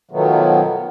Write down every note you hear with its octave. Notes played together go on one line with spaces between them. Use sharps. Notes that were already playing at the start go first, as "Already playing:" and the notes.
B2 D#3 F3 F#3 A3 B3